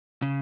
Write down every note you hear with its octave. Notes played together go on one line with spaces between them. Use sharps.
C#3